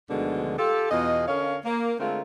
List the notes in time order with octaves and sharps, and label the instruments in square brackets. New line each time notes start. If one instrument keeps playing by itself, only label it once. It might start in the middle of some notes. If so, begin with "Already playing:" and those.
[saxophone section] D2 B2 D3 D#3 F3 G#3
F4 G4 A4
E2 B2 F4 G#4 D#5
D3 C#4 A#4 C#5 F5
A#3
D3 G#3 A3 C4 F4 A#4